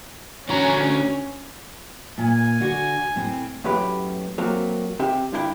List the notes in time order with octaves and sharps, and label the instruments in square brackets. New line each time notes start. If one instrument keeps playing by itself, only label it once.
[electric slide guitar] D3 F#4 A#5 [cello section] C#4
[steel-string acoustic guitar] A#2 [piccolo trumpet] G#5
[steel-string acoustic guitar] D3 F#4
A2 C4
[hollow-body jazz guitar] F#2 A2 F#3 A3 G4 B4
F#3 A3 A#3 C4
C3 G4 E5 G5
G2 D3 D4 E4 G#4 G5